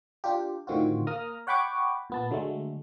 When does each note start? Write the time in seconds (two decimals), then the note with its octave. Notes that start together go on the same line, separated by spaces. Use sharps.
0.24 D4 F4 G4
0.67 A2 D3 D#3 C4 F4 F#4
1.07 A#3 A#5 D#6 F6
1.47 C#5 F#5 G5 B5 C#6 D6
2.10 A#2 B3 A5
2.31 D3 F#3 G#3 A3